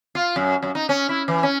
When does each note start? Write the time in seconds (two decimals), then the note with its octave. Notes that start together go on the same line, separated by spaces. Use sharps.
0.15 F4
0.36 F#2
0.63 F#2
0.75 D#4
0.89 C#4
1.09 E4
1.28 E3
1.43 C#4